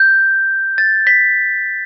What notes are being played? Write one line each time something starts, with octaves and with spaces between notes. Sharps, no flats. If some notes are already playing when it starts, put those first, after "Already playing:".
Already playing: G6
A6
B6